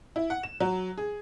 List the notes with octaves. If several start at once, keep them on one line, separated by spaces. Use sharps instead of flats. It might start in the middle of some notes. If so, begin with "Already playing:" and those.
E4
F#5
E7
F#3
G#4